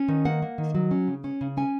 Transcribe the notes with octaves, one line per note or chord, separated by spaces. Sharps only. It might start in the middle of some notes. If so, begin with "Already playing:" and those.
Already playing: C#4
D#3
A#3 F#5
A#3
D#3
F#3
C#4
C#3
C#4
C#3
C#4 G#5